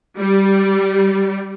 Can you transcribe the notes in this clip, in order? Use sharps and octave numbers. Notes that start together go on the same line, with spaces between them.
G3